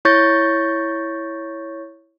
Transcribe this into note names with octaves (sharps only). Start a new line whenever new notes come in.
E4 C#5 C#6 G6 A6 A#6